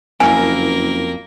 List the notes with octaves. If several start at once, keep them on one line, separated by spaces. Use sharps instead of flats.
F#1 F2 A#3 E4 A#4 F5 G#5